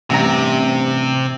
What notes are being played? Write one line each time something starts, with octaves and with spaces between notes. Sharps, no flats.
A1 G2 C3 A#5